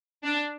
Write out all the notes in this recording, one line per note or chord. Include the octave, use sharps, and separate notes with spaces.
D4